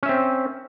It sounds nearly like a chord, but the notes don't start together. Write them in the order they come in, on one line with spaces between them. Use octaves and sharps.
C#4 E5 C4